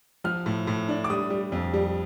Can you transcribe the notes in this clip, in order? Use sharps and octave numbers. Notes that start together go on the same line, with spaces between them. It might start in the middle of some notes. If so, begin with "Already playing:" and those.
F3 F6
A2
A2
D4
D6
G3 D#6
G3
F2
G3